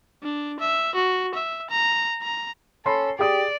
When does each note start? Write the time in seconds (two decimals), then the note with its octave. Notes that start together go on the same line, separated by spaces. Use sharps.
0.23 D4
0.60 E5
0.95 F#4
1.34 E5
1.70 A#5
2.22 A#5
2.86 C#4 A4 B5 C6 C7
3.19 G4 G#4 D5 D#6